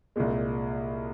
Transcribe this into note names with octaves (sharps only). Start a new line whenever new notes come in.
C2 A#2 G#3